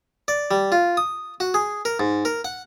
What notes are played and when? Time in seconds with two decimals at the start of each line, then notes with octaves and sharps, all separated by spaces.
0.28 D5
0.51 G3
0.72 F4
0.97 D#6
1.40 F#4
1.54 G#4
1.85 A#4
2.00 G#2
2.25 A#4
2.45 F#5